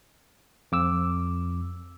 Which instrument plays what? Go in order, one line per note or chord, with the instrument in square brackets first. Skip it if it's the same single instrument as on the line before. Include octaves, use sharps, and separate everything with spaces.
[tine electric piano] F2 D6 E6